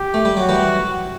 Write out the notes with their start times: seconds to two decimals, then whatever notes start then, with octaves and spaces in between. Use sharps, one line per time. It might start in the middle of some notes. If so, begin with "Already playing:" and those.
Already playing: G4
0.14 A3
0.25 G3
0.37 F#3 F#4
0.49 E3 G3